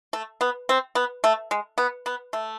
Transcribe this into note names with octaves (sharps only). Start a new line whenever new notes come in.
A3
B3
C4
B3
A3
G#3
B3
B3
A3